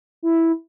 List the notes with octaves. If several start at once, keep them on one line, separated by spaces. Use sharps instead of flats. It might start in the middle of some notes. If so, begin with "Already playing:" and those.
E4